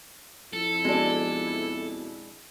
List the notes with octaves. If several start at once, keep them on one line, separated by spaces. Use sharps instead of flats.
F2 E4 A4
B2 G#3 D4